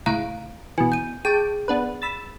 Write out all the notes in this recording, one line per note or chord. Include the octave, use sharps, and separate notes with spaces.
C#2 A2 F5 A#5 F#6 D7
B2 E3 G#5
G6 D#7
G#4 G5 A5 D6
B3 D4 B4
B5 E6 A6